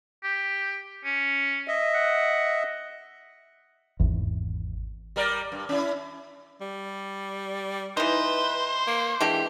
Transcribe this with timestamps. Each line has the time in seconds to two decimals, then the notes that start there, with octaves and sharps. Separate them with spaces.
0.23 G4
1.05 C#4
1.68 D#5 E5
1.95 F#5
4.00 G#1 E2
5.16 G3 A#4 D5
5.52 G2
5.69 C#4 E4
6.61 G3
7.97 E3 D#4 B4 C5
8.87 A#3
9.21 E3 G#3 D4 G4